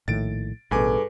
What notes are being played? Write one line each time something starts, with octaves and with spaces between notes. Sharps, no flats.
A#1 A2 D#3 A6 D7
A1 G2 B2 G#4 A4 B4 G#5 D6